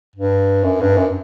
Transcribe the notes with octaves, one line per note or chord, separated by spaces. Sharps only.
G2
F#2
G2
F#2